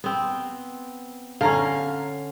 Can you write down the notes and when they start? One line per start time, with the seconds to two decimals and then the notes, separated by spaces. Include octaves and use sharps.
0.04 B3 C4
1.41 D3 C#4 F5 A#5